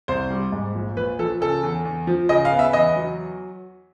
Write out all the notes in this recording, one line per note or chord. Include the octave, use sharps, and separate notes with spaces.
C2 C5
G3
G#2
A#1
A#1 B4
F3 A4
C#3 A4
E2
E2
F3
C#3 D#5
F5
B3
E5
E2 D#5
F#3